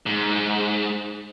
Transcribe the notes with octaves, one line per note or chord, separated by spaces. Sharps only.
G#2